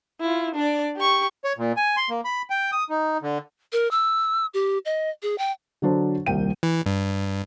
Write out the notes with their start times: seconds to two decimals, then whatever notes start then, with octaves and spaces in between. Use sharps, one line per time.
0.21 E4 F4
0.55 D4 D5
0.97 G4 C#6
1.44 C#5
1.58 A#2
1.77 G#5
1.97 C6
2.10 A#3
2.25 B5
2.50 G5
2.72 D#6
2.90 D#4
3.22 D3
3.72 A#4
3.91 E6
4.54 G4
4.85 D#5
5.23 G#4
5.38 G5
5.82 D3 F#3 D4 C5
6.26 D#1 C2 A#3 G5 D#7
6.63 E3
6.86 G2